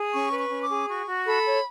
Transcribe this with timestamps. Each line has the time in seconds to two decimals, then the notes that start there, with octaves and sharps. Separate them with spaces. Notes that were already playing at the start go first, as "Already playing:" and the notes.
Already playing: G#4
0.12 C#4 C#6
0.31 B4
0.38 C#6
0.50 C#4
0.63 D6
0.70 G#4
0.88 F#4 C#6
1.07 F#4
1.25 A4 B5
1.45 C#5